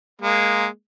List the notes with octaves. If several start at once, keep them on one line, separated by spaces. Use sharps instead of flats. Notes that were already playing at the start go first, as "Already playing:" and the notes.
G#3 A#3